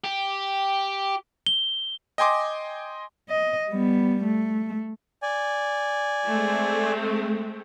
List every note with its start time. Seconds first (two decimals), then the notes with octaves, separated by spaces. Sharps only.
0.04 G4
1.47 G7
2.18 D#5 G5 G#5 C6 D6
3.29 D#5
3.70 G3 B3
4.24 A3
5.22 D5 G#5
6.26 G#3 A3 C4